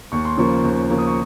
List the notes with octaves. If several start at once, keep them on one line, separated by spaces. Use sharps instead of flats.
D#2 C#6
C6
C#3 F3 A#3 C#6
D#2
C#3 F3 A#3
D#6
C#6